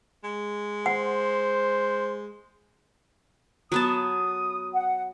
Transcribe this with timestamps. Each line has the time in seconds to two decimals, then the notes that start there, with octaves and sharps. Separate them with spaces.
0.24 G#3
0.86 C5 F#5
3.72 F#3 B3 A5 D#6
4.73 F#5